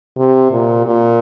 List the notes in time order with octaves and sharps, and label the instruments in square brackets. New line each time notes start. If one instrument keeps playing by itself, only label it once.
[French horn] C3
A#2
A#2